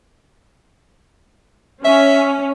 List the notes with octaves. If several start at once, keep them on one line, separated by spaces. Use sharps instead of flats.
C#4 E5